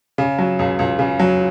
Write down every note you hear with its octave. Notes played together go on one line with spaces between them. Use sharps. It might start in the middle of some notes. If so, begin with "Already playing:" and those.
C#3
F#3
C#2
C#2
C#3
F#3